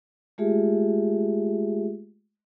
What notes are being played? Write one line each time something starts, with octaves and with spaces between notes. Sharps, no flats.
G#3 A3 F4 G4 G#4 E5